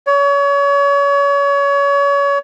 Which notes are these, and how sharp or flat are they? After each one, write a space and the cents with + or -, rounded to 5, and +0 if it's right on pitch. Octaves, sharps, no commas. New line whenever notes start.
C#5 +30